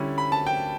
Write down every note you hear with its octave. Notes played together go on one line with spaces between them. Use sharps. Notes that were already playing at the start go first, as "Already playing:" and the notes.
Already playing: D3 G3 C#4 E4
B5
A5
G5